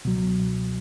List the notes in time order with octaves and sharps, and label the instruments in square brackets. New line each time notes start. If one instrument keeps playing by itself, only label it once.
[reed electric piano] C#2 B2 F#3